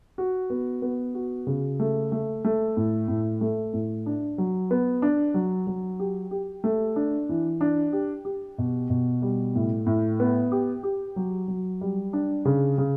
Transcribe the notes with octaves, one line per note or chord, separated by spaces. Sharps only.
F#4
B3
B3
F#4
C#3
A3
A3
A3
A2
A2
A3
A2
D4
F#3
B3
D4
F#3
F#3
G4
G4
A3
D4
E3
D4
G4
G4
B2
B2
G3
A2
A2
B3
G4
G4
F#3
F#3
G3
D4
C#3
C#3